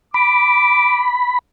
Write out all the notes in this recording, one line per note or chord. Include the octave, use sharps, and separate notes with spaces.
B5 D6